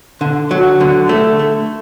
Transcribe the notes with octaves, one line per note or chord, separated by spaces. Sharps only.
D3
F#3
D3
A3
A3